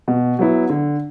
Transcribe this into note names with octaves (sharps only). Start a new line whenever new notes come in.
B2
F#3 B3 E4
D3